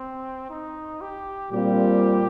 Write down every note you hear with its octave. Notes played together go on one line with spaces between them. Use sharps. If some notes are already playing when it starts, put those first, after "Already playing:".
Already playing: C4
D#4
G4
A#2 G3 C4 F4 G4